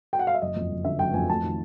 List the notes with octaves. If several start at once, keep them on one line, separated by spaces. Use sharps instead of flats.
G5
F#5
F5
E5
F#1 D#5
F2
F#1
D3 E5
F#1 G5
F2 G#5
A3 A5
D#3